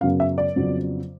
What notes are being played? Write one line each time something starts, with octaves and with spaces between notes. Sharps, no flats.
F#2 C#3 F#3 B3 F5
E5
D5
F2 C#3 F#3 B3